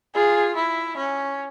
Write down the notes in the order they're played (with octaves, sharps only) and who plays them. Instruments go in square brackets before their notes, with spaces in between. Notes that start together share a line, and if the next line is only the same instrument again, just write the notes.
[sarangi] F4 [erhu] G#4
[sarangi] E4
C#4